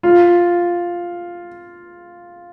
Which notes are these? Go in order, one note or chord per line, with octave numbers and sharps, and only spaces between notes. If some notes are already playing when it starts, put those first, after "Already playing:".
F4